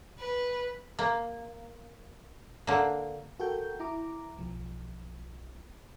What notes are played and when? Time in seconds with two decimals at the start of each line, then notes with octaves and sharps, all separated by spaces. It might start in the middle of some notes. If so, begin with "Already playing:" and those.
0.19 B4
0.99 A#3
2.67 D3 A#3
3.40 F#4 A4 A#4 G5 G6
3.80 E4 A#5 D6
4.39 B1 F3